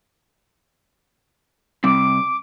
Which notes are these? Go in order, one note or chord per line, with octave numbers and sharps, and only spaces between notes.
C3 G3 C4 D6